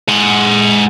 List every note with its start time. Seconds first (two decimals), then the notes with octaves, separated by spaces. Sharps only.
0.08 G#3 F#5